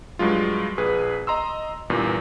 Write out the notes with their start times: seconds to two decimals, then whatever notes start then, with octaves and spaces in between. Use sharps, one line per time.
0.19 G2 F#3 G#3 F4
0.78 A#1 G#4 B4 D#6
1.27 D#5 A#5 C6 E6
1.90 E2 G2 A#2